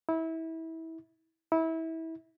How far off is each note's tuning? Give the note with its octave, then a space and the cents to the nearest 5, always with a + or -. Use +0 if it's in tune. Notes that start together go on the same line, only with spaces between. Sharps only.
E4 -25
E4 -25